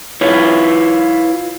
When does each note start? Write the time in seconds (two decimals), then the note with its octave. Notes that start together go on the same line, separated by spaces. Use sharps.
0.21 E4 F4 B4 C#5